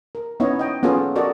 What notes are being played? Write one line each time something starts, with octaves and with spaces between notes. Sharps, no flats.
A#4
B3 C#4 D#4 E4 C#5 D#5
D#5 G5
B3 C#4 F4 G#4 A4
F#4 A4 A#4 D5 D#5